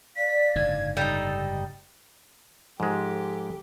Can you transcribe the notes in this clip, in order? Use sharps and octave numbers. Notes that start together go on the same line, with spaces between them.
D5 F5 B6
F#1 G#2 D3 G#6
G3 D#4 A4
D#5
G#2 F3 G#3 G4 A4